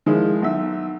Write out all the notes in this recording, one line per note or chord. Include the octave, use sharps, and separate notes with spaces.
D#3 F3 G#3 E4
B1 E5